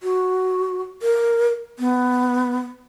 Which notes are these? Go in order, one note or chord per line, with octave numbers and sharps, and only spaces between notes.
F#4
A#4
B3